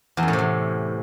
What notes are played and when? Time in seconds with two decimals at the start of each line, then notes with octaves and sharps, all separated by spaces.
0.17 E2
0.23 F#2
0.28 A2
0.33 C3
0.39 E2